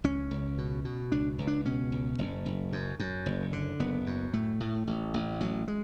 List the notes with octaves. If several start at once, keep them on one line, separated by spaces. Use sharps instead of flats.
C#2 C#4
C#2
B2
B2
C#2 D4
C#2
D4
B2 C#4
C#2
F#1
F#1
F#2
F#2
F#1
D3
F#1 B3
F#2
A2 A3
A2
A1
A1
A1 F#3
G#3